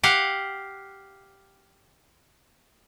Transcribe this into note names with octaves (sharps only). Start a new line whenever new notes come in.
G4 F5 F#5